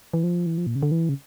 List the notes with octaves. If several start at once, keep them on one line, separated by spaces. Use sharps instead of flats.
E3
F3
E3
F3
A#2
C#3
D3
E3
C#3